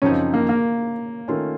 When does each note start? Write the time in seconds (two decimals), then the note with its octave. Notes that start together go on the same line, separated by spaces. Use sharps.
0.02 F#2 C#3 F3 C4 C#4 D#4
0.34 A#3
0.49 A#3
1.28 D#3 A3 C#4 F4